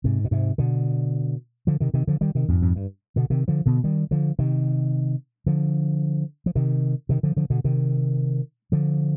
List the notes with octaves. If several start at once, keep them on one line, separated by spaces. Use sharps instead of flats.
G#2 C3
B2
G#2 C3
B2 D3
D3 F3
C3 D#3
C3 D#3
D3 F3
D#3 G3
C3 D#3
F2 G#2
F2 G#2
G2
B2 D3
C3 D#3
D3 F3
B2 D3
D#3 G3
D3 F3
C3 D#3
D3 F3
F3
C3 D#3
C3 D#3
D3 F3
D3 F3
B2 D3
C3 D#3
D3 F3